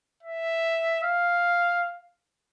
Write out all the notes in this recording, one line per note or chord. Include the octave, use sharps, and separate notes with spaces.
E5
F5